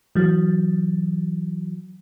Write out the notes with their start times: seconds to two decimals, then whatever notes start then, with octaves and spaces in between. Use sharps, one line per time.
0.15 E3 F#3